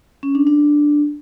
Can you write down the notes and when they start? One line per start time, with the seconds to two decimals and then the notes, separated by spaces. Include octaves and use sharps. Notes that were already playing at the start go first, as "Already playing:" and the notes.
0.23 C#4
0.35 D4
0.47 D4